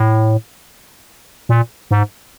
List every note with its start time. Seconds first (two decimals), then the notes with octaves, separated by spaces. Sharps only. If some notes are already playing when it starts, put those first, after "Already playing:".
Already playing: A2
1.49 A#2
1.91 G#2